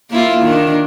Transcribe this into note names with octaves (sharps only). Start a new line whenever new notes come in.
A#3 E4 F4
D#3 D4